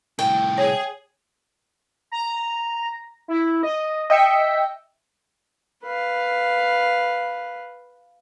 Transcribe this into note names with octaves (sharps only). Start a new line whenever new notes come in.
C2 A2 G5
G#4 C#5
A#5
E4
D#5
D#5 E5 G5 C#7
B4 F5